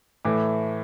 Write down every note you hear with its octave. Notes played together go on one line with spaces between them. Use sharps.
A2 E3 A3 D6